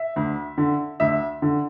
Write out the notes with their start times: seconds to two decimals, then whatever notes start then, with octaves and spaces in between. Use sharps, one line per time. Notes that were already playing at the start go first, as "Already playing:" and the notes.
Already playing: E5
0.16 D2
0.58 D3
1.00 D2 E5
1.42 D3